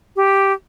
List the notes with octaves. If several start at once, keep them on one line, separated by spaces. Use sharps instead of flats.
G4